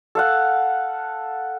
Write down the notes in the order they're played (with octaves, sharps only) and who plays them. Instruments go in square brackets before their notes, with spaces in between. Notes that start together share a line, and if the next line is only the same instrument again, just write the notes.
[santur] A4 F5 F#5